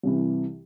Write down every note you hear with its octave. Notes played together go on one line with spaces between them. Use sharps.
C2 C3 E3